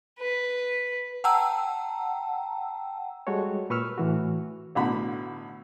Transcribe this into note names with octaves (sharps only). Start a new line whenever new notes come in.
B4
F#5 G5 A5 A#5 E6
G3 G#3 F#4 A4 C#5
A#2 B4 C#6 E6 F6
A2 E3 F#4
B1 A2 D3 F#4 B5